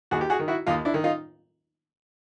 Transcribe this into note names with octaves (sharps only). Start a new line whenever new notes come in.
D#2 F#4 G#4
G4
F#4 G#4
D#3
E4 F#4
D#2 D#4 F4
D4 E4
D#3
D#4 F4